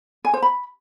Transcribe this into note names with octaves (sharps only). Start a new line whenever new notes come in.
G#5
C5
B5